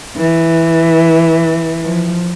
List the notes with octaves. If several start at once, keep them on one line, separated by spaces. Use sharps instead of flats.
E3
F3